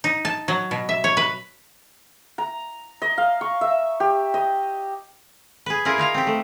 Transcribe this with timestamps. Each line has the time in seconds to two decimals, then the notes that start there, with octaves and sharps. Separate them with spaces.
0.04 D#4
0.25 A5
0.48 F#3
0.71 B2
0.89 E5
1.04 C#5
1.17 B4
2.38 A#5
3.02 D#5
3.18 F5
3.41 C#6
3.61 E5
4.00 G4
4.34 D#5
5.66 G#4 B4
5.85 E4 F4 G#4 A#4
5.98 D#4 F4 F5 A#5
6.14 C4 G4
6.27 A3